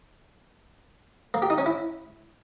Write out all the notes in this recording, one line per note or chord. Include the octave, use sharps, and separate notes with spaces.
A#3
G4
D#4
C#4
E4